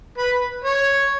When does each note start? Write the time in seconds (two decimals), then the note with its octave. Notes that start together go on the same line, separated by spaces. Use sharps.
0.18 B4
0.64 C#5